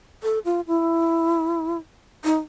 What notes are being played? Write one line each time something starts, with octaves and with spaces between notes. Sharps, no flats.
A4
F4
E4
D#4